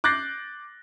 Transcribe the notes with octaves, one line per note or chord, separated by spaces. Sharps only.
D6 F#6 G6 A6 A#6 C7